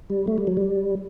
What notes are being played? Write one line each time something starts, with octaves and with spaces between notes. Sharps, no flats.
G3
A3
G3
F#3
G3